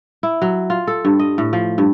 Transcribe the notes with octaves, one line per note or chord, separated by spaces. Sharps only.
E4
F#3
F4
A4
G2
D#5
A2
F3
G2